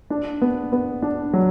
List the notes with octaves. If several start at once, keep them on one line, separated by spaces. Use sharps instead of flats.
D4
B3
B3
D4
F#3